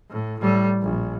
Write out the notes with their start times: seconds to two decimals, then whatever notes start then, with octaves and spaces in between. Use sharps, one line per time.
0.10 A2
0.40 A2 G3
0.82 A#1